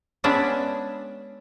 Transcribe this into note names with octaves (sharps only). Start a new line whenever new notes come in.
G#3 B3 C#4 D4 E5